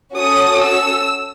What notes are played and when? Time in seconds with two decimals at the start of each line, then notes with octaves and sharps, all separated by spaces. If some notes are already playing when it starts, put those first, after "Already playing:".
0.16 C#4 F#4 A4 D#6
0.63 E6